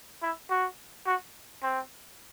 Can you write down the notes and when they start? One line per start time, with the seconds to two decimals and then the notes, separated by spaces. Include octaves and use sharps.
0.22 E4
0.50 F#4
1.07 F#4
1.63 C4